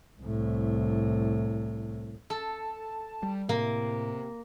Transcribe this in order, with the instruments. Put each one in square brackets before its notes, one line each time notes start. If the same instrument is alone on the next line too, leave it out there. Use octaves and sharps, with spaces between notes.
[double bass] C2 A2
[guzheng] A4 [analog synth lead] A5
[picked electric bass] G3
[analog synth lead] A2 [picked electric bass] C3 [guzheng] A#3